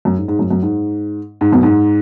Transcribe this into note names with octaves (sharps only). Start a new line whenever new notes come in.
F#2
G#2
G#2
F#2
F#2
G#2
G#2
F#2 B2
G#2